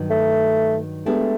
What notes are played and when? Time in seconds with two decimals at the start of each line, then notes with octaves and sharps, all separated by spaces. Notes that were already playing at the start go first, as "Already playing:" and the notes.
Already playing: G2 D#3 F#3
0.10 A3
1.06 G#3 A3 B3 D4 G4